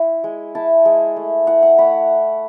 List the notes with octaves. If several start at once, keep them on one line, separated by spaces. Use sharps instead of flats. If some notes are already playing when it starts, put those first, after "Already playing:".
Already playing: E4
G#3
E4 A5
G#3
A3
E4 F#5
F#5
A3 B5